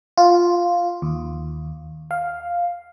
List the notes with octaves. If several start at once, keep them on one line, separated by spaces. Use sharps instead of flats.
F4
D#2
F5